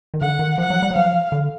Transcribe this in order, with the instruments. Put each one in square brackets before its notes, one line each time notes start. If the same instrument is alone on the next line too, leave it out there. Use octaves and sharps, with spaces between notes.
[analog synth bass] D#3
[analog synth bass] D3 [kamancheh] F#5
[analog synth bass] D#3
[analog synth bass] F3 [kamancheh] F#5
[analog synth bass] F#3
G3
F#3
[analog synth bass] F3 [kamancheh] F5
[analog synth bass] D3